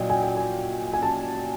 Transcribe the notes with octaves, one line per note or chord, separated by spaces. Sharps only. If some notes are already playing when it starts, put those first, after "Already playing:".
Already playing: A#2 F#3 D#5 G5
G#5
G5
G#5
G#5
A5